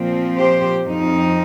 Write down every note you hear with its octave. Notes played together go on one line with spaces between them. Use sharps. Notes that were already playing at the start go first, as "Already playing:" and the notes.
Already playing: A#2 F3 C4
G4 C5
F2 F3 C4 D#4